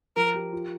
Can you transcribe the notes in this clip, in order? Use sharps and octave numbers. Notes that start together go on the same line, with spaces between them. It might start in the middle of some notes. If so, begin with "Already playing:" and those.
F3 A#4
G4
F4